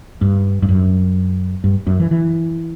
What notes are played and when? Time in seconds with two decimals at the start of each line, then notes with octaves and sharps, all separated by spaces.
0.21 G2
0.62 G2
0.69 F#2
1.64 G2
1.87 F#2
2.00 E3
2.11 E3